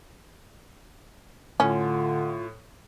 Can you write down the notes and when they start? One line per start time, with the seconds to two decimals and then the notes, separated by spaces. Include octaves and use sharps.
1.60 A2 D3 C#4 F4